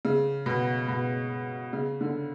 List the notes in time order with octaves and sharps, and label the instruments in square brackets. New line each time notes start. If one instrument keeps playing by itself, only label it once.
[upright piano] C#3
B2
B2
C#3
D3